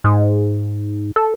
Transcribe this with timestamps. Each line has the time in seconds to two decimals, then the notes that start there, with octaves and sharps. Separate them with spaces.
0.04 G#2
1.16 A4